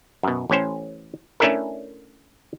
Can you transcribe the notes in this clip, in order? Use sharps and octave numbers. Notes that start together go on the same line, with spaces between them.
F#2 B2
A1 A2 C#4 C5
A3 C#4 D4 E4 A4 A#4